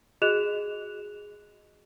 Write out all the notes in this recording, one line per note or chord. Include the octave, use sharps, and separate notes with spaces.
F#4 G#4 D#5 F#6 E7 F7